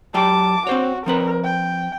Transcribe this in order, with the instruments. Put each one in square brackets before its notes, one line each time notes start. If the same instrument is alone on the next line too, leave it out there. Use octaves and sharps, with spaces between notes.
[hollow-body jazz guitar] F#3 G4 G5 [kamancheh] A5 D6
[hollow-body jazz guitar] C4 C5 C#5 [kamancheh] F#4
[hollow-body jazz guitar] F3 C4 B4 [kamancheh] A#4
[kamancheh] G5